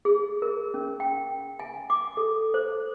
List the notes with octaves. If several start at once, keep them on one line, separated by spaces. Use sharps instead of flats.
G#4
A#4
C#4
G5
G#5
D6
A4
C5